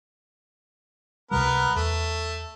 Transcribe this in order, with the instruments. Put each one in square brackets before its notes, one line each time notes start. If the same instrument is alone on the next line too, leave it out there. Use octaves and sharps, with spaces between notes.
[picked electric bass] C#2 C3 G3 [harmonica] B3 A#4 B4
[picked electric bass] E2 [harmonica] A3